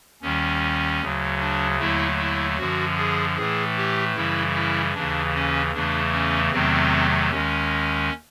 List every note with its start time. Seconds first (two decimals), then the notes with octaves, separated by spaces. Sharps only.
0.22 D#2 D#3 G3 C#4
1.00 D2 C#3 F#3
1.40 D4
1.79 D#2 D3 F#3 A3 E4
2.19 E4
2.58 F#2 D3 F3 F#4
2.98 G#4
3.37 A2 E3 A3 G#4
3.77 G4
4.15 F#2 C#3 E3 G3 E4
4.55 E4
4.94 D#2 C#3 E3 D4
5.34 C#4
5.73 E2 C#3 E3 A3 D4
6.12 C#4
6.52 E2 C3 D#3 F#3 A3 C4
7.30 D#2 D#3 G#3 C#4